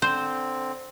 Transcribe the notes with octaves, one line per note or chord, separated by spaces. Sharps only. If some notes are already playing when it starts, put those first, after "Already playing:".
D3 C4 C5